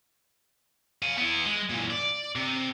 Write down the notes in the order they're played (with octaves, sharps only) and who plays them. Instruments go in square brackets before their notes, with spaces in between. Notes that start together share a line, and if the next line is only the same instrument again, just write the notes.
[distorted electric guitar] F5 G#5
B3 E4
G#3
A#2 E3
D5
C3